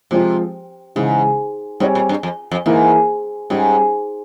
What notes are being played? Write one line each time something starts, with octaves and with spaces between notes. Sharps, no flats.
C3 F3 G#3 C4 F4
G#2 C#3 E3 G#3
G#2 G3 C4 G4 C#5
A#2
G2
F2
F2
G#2 E3 A#3 E4
G#2 G3 C#4 G4 C#5